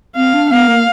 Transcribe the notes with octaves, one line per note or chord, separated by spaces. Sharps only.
C4 F5
D4
B3 F5
A#3